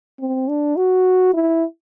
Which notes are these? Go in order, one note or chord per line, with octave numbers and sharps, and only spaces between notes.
C4
D4
F#4
E4